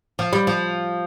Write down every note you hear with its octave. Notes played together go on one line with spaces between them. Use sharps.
F3
G3
F3